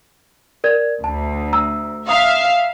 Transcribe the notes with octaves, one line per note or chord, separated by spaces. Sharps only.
A#4 D5 G#6
D2 A5
A#5 E6
E5 F5 A#5 D#6